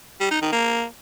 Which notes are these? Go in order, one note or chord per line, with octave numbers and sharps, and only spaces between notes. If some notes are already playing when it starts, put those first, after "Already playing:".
G3
D#4
D#3
A#3